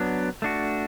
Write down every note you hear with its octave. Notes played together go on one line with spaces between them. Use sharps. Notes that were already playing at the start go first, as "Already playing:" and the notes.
Already playing: F#3 B3 D4
A3 D4 F#4